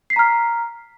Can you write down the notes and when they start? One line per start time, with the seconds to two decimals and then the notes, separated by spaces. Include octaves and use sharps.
0.10 C7
0.13 B6
0.16 A#5
0.19 F6